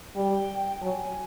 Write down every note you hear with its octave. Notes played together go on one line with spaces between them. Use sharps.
G3 G5
F#3 G#5 A5